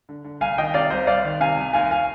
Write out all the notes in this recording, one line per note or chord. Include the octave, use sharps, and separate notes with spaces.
D3
D3
C2 F5 G#5
D#3 D#5 G5
C3 D5 F5
C2 C5 D#5
C2 D5 F5
D#3
C3 F5 G#5
C2
D#2 F5 G#5
F5 G#5